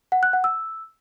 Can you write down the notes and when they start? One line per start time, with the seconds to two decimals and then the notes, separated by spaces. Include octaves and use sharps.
0.12 F#5
0.23 F#6
0.33 F#5
0.44 E6